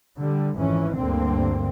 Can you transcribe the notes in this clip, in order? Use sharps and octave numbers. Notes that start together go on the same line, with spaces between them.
D3 G3
G#1 F2 E3 C#4
D2 G2 D3 A#3 C4